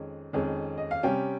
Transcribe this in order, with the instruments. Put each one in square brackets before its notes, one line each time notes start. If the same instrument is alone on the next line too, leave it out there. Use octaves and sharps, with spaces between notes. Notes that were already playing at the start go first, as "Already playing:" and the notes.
Already playing: [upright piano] F2 D#3 G#3 C#4
F2 D#3 G#3 C#4
D#5
F5
C3 G3 C#4 G5